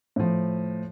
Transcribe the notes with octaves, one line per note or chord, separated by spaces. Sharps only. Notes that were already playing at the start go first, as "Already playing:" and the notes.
A2 F3